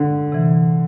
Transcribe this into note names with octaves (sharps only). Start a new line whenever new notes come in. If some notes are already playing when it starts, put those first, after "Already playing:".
Already playing: D3
C3 E3